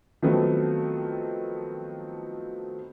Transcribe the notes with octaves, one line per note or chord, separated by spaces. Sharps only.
D#3 F3 F#3 A3 B3 C4